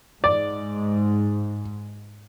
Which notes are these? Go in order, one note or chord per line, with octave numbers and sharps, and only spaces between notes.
G#2 D5